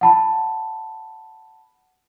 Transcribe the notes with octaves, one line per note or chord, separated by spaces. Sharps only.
F#5 A5 B5